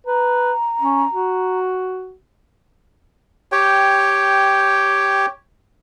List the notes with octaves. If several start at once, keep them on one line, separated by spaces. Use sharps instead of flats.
B4 A#5
C#4
F#4
G4 C#5 G5